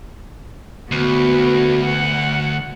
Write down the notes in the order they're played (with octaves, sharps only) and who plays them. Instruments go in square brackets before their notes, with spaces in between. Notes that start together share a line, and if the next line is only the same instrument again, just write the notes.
[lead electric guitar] D2 [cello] B3 F#4
[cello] F#5